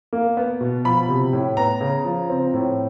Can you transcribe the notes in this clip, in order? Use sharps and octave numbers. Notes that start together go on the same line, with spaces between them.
A#3
B3
B2
F3 B5
C3
A2
B3 A#5
C#3
F3
C4
A2